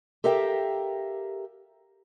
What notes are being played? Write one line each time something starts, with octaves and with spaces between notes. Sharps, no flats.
G4 A4 A#4 E5 F5 G5